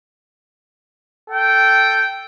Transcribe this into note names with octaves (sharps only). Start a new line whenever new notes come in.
A4 G5